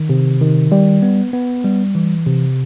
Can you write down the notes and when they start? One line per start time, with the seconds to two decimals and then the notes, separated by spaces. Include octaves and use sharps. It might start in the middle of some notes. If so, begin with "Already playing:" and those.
Already playing: D#3
0.09 C3
0.41 D#3
0.72 G3
1.02 B3
1.33 B3
1.65 G3
1.95 E3
2.27 C3